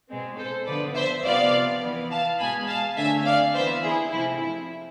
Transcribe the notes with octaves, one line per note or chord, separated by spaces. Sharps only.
B2 G#3 C4
A4 C5
D3 F3 B3 B4 D5
C5 E5
C3 F3 B3 D5 F5
E3 B3
F5 A5
B2 G#3 B3 G#5 B5
F5 A5
D3 A3 C4 E5 G#5
D5 F5
E3 B3 C5 E5
E4 G#4
C3 F3 A3 C4 E4
E4